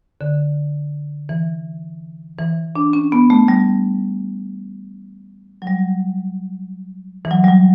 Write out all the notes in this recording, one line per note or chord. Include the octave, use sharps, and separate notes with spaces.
D3
E3
E3
D4
C#4
B3
A3
G3
F#3
G3
E3
F#3
G3
F#3